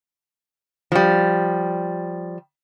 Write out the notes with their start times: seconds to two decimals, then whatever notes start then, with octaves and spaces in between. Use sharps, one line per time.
0.92 F3 G3